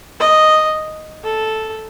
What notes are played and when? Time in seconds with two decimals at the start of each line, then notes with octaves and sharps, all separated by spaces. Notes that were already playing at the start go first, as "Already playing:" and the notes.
0.20 D#5
1.24 A4